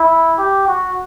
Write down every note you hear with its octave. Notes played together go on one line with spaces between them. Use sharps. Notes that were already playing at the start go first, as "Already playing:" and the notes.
Already playing: E4
G4
F#4